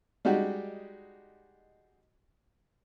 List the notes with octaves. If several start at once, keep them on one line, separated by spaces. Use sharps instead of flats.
G3 G#3 D#4 F#4 G4